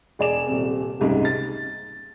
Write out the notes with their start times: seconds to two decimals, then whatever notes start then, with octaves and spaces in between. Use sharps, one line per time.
0.19 E1 G#4 D5 G#5 E7
0.47 D#1 C3
1.00 F#1 C2 G#2 C#3
1.25 A6